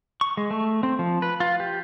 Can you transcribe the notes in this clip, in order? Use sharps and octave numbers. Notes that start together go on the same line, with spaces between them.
C#6
G#3
A3
C4
F3
B4
F4
G4